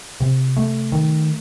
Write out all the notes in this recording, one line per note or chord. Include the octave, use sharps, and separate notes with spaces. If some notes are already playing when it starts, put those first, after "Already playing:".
C3
A3
D#3